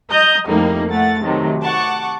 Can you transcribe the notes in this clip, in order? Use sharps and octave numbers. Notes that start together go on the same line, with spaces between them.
D#5 A#5 D#6 G6
F2 A2 G3 A#3 D#4
A2 A3 F#5 A6
C3 D#3 F#3 A3
F#5 A5 C#6 D6